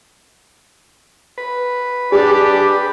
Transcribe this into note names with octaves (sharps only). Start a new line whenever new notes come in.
B4
D4 G4 G#4 D5